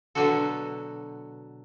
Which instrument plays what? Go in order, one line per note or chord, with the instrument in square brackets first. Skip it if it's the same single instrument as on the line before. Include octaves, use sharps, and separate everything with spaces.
[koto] B2 D3 F#3 D4 F#4 A4